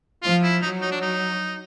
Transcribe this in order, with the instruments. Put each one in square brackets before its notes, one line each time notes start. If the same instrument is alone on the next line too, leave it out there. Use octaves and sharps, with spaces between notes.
[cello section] F3 [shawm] F4
[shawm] E4
[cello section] F#3 [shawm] D#4
[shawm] D#4
D4
D#4